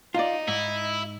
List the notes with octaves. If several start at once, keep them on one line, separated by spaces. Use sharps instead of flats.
D#4 F4 D5
G#2 E4